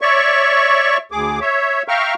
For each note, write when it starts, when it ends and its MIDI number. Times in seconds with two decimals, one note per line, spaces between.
0.01 0.97 73
0.01 0.97 74
0.01 0.97 76
0.01 0.97 85
1.12 1.39 38
1.12 1.39 68
1.12 1.39 86
1.41 1.83 73
1.41 1.83 76
1.88 2.14 76
1.88 2.14 77
1.88 2.14 79
1.88 2.14 82
1.88 2.14 85
1.88 2.14 89